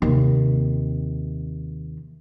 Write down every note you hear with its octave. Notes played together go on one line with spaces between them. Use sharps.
D#2 C3